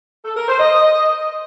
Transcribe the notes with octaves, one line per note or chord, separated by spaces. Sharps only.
A4
A#4
C5
D#5